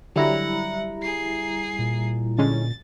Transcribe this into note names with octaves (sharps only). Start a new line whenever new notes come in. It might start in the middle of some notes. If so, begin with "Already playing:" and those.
D3 F#3 G3 E4 F#5 A#5
G#4 C7
A#2
D3 G#3 C#4 A6